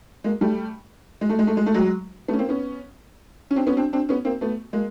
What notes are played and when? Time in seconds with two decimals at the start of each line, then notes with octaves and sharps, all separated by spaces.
0.24 G#3 A#3
0.41 G3 A3
1.21 G#3
1.29 A3
1.39 G#3
1.47 A3
1.57 G#3
1.66 A3
1.74 F#3 G#3
2.28 A3 B3
2.33 C#4
2.39 A#3 C4
2.49 B3 C#4
3.51 C#4
3.56 C4 D4
3.67 B3 C#4
3.77 C4 D4
3.93 C4 D4
4.09 B3 C#4
4.25 A#3 C4
4.41 A3 B3
4.73 G#3 A#3